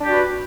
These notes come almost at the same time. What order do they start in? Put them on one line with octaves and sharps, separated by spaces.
D4 G4 D5 F#4 B4